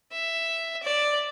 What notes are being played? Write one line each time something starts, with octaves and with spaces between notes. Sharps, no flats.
E5
D5